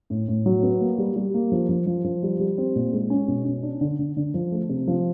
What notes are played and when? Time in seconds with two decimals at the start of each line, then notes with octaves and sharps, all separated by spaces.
0.10 A2
0.28 A2
0.46 F#3
0.63 B3
0.81 A#3
0.98 G3
1.16 G3
1.34 A#3
1.52 F3
1.69 F3
1.86 F3
2.04 F3
2.23 G3
2.40 G3
2.58 C4
2.76 A#2
2.93 G#3
3.10 C#4
3.28 B2
3.45 C#4
3.63 D4
3.81 D3
3.99 D3
4.17 D3
4.34 F3
4.52 A3
4.69 C3
4.87 F3